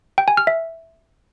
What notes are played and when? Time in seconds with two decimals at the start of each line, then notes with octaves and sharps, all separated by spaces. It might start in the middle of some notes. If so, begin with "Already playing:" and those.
0.18 G5
0.28 G#5
0.37 F6
0.47 E5